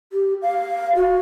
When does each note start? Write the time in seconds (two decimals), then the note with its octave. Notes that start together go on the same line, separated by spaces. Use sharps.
0.13 G4
0.42 F5
0.95 F#4